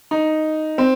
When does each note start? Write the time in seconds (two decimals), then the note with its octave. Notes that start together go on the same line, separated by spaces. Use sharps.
0.11 D#4
0.78 C4